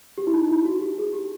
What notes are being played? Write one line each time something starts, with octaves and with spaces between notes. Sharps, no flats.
G4
E4
D#4
E4
F#4
G4
G#4
G4